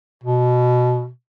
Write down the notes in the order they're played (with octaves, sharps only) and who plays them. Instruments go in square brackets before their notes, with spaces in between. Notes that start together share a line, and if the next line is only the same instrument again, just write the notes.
[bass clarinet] B2